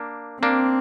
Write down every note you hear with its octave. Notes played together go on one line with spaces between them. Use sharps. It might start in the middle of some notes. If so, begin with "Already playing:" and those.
Already playing: A#3 D4
A#3 C4 D4